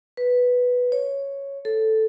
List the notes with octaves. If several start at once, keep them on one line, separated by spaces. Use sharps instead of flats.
B4
C#5
A4